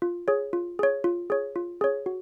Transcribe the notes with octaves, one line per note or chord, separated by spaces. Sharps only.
F4
G#4 C#5
F4
G#4 C#5
F4
G#4 C#5
F4
G#4 C#5
F#4